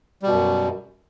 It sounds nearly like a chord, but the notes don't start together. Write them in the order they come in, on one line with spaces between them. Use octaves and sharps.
G3 B2 F#2